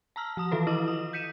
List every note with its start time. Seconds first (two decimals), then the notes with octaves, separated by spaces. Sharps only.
0.16 A5 A#5 E6 F6
0.37 F3 A5 D#6
0.52 D#3 E3 A4 B4
0.67 E4 A4 D#5 D6 D#6 F#7
0.88 D#6
1.13 G6 B6 C#7 D#7 E7